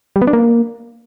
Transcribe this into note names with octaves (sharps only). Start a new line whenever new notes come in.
G3
B3
D4
A#3